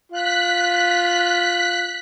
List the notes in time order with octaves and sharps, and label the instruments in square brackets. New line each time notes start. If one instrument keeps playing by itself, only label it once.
[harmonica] F4 [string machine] F#6 B6